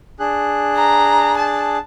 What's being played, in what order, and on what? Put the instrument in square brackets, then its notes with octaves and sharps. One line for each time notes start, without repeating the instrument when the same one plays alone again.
[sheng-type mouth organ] D4 G#4 F#6
[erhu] A#5
A5